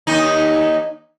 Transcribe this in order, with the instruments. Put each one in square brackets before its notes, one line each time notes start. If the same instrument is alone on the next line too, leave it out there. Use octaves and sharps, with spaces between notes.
[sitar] D#2 D#4